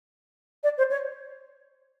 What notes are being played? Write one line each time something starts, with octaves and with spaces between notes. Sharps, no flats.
D5
C5
C#5